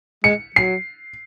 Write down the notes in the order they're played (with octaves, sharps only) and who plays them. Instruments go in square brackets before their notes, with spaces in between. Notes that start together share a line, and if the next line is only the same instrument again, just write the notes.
[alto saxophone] G#3 [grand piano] C#7
[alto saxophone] F#3 [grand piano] C7